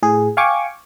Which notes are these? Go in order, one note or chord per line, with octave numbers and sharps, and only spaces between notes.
A2 G#4
F5 G5 G#5 C#6 D6